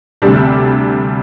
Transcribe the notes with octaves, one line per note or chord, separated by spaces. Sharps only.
D2 C3 G3 D4 G4